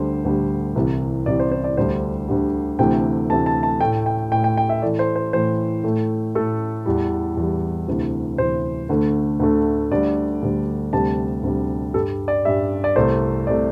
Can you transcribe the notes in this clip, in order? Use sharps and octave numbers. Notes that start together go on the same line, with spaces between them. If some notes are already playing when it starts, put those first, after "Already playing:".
Already playing: D2 D3 G3 C5
D2 D3 G3
C2 C3 E3
C2 C3 E3 D5
C5
C5
D5
D2 D3 G3 C5
D2 D3 G3
D2 C3 E3 A3 G5
D2 C3 E3 A3 A5
A5
A5
A2 A3 G5
G5
A2 A3 G5
G5
G5
E5
A2 E3 A3 D5
C5
C5
A2 E3 A3 C5
A2 A3
A2 A3 A4
E2 E3 G3
E2 E3 G3
D2 C3 E3
D2 C3 E3 C5
D2 D3 A3
D2 D3 A3
D2 D3 G3 D5
D2 D3 G3
D2 C3 G3 A5
D2 C3 G3
G2 G3 A4
D5
G2 G3 E5
D5
C2 C3 A3 C5
C3 A3 D5